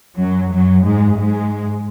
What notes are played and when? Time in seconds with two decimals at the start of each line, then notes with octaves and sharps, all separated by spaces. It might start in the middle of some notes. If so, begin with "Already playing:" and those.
0.19 F#2 F#3
0.52 F#2 F#3
0.84 G#2 G#3
1.17 G#2 G#3